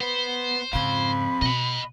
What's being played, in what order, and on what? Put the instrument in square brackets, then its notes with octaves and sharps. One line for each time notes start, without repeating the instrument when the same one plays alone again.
[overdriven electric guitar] B3 B4 [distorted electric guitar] C5
[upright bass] G#2 C#3 [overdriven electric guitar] C4 F5 [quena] B5
[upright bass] B2 [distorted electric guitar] D#5 F#5